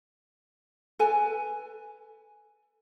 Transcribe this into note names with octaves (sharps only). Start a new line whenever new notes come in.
A4 B4 G#5